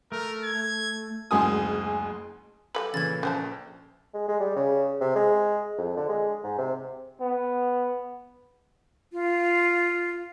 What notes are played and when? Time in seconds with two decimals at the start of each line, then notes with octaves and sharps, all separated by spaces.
0.12 A3 A#4
0.44 G#6
1.31 F#1 D2 G#3 G#5 D#6
2.75 G3 A3 A4 B4
2.94 A#2 C#3 E3 G#6 A6
3.23 A#1 C#4 B4 C5 G5 A5
4.14 G#3
4.28 G#3
4.40 G3
4.56 C#3
5.00 C3
5.15 G#3
5.78 F2
5.97 D3
6.09 G#3
6.44 G#2
6.58 C3
7.21 B3
9.13 F4